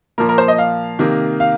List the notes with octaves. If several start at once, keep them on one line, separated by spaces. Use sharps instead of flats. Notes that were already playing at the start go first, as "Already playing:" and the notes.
A#2 F3 A#3 A#4
A#4
C5
D#5
F5
C3 D#3 A#3
F5